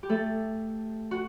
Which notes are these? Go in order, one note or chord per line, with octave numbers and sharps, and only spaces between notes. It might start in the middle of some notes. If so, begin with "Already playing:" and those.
G4
A3 A4
F#4